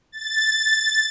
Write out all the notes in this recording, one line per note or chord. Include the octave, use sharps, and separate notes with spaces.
A6